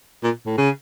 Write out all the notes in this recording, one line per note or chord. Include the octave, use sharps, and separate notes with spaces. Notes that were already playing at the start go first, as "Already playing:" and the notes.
A#2
A2
C#3